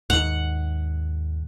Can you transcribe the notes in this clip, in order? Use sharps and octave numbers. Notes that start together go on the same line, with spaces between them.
D#2 G#2 F#5